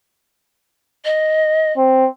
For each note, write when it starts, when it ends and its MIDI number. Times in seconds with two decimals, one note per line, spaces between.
1.05 1.73 75
1.76 2.07 60